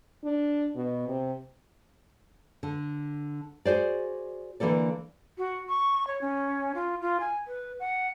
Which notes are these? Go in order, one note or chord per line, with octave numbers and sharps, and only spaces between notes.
D4
B2
C3
D3
F#4 G#4 C5 D5
D3 E3 A#3 A4 D5
F#4
C#6
C#5
C#4
F4
F4
G#5
B4
F#5